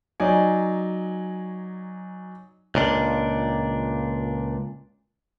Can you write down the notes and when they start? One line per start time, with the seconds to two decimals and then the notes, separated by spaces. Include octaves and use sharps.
0.20 F#3 D#4 D5 G#5
2.75 C#2 A#2 D4